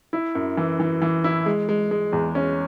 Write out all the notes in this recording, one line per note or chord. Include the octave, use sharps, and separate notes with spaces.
E4
F#2
E3
E3
E3
E4
G#3
G#3
G#3
E2
C#4